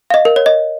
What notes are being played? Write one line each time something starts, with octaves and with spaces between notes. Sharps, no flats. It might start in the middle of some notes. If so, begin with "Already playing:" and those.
F5
D#5
A#4
C#5
D#5